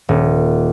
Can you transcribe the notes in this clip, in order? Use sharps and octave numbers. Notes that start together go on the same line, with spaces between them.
D#1